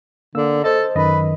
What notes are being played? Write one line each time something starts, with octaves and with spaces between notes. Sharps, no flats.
D3 A#3 E6
A4 C5 D#5
F#2 D#3 B4 D#5